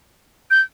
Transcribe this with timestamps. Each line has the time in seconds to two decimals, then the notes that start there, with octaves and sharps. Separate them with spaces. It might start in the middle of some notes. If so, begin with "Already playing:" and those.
0.51 G6